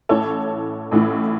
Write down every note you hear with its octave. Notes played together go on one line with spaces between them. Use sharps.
A1 A2 E3 A4 C#5
A1 A2 E3